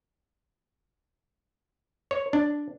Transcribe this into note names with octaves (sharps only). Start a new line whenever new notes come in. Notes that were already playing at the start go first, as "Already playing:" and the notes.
C#5
D4